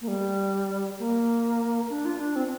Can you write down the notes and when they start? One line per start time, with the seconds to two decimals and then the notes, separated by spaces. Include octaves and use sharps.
0.01 A#3
0.08 G3
0.99 A#3
1.90 D4
2.05 F4
2.20 D4
2.36 C4